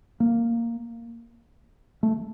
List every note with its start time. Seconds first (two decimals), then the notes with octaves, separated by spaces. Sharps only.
0.20 A#3
2.03 A3